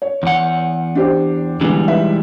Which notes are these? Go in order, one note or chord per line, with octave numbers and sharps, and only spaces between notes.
C#5
E2 F#5
D4 G4 C5
D3 E3 G3 G#3 B3 D4
D#4 B4 E5